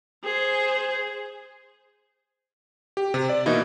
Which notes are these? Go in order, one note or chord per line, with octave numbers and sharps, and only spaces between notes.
G#4 C5
G4
C3
D5
B2 E3 A#3 D#4 E4